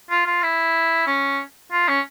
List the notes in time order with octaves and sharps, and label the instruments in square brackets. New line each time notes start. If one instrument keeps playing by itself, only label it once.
[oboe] F4
F4
E4
C#4
F4
C#4